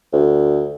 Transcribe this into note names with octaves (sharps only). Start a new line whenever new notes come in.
D2